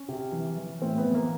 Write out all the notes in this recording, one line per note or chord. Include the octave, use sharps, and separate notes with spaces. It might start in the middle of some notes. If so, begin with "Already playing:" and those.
Already playing: C#4
C3
E3
E3
A2 C4
B3
E3
A#3